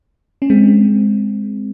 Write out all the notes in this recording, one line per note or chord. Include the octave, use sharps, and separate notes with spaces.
C#4
G#3 C4